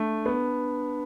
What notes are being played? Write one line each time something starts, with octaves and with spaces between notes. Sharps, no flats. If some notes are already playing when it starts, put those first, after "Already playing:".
Already playing: A3 D4
B3